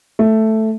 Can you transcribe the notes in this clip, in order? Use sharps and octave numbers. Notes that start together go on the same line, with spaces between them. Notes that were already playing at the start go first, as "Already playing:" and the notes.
A3